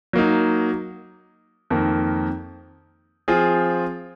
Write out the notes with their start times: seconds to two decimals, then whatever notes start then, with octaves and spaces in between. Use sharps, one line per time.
0.13 F#3 A#3 D#4
1.70 F2 D#3 A#3
3.28 F3 C4 F4 G#4